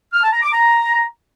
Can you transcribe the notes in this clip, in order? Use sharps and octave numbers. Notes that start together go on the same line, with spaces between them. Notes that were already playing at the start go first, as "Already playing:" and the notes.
F6
A5
A#5
D6
A#5